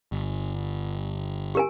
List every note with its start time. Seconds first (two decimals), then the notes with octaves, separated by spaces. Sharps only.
0.12 G1
1.55 G4 A#4 G#5